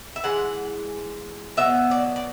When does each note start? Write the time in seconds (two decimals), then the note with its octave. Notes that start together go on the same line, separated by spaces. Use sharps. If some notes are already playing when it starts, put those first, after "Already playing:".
0.16 E5
0.24 E3 G#3 F#5
1.57 B2 F#3 B3 E5
1.91 D5
2.16 D5